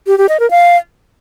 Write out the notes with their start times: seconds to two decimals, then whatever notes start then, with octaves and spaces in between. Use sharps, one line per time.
0.07 G4
0.18 G4
0.29 D#5
0.40 A#4
0.51 F5